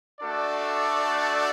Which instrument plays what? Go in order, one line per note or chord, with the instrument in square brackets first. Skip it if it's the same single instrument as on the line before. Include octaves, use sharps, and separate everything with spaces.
[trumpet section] A3 D4 F#4 A4 D5